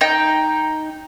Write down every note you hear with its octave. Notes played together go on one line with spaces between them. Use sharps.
D#4 G5